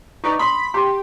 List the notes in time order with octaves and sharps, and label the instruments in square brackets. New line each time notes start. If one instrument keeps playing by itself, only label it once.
[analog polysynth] D#4 B4 D5 [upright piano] C#6
[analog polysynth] B5 [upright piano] C6 D#6
[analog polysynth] G4 [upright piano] C6